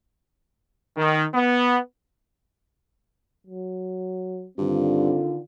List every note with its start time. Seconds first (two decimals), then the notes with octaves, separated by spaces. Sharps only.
0.97 D#3
1.35 B3
3.47 F#3
4.58 G2 D3 D#3 C4 F4